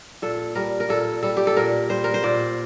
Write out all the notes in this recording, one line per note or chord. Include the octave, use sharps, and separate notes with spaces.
A#2 A4
G3 A#4
A#4
A#2 A4
G3 A4
G4
A4
A#2 A#4
G3 C5
A#4
C5
A#2 D5